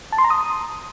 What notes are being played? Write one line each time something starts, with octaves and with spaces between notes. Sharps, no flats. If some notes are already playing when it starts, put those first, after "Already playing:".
A5
C6
A#5
D#6